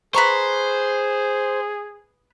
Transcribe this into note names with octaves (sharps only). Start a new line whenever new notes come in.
G#4 B4 C5 A#5 C#6